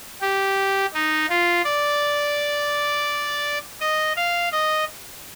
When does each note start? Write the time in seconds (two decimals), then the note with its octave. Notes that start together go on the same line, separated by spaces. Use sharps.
0.21 G4
0.94 D#4
1.29 F4
1.65 D5
3.81 D#5
4.16 F5
4.53 D#5